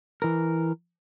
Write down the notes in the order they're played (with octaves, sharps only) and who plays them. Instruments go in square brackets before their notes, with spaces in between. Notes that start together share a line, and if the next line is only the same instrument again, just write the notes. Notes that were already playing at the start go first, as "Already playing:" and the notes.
[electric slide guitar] E3 A#4